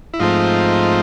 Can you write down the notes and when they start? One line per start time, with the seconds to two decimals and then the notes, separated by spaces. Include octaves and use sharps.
0.14 E4
0.19 G#2 F3 A3 C4 D#4 F4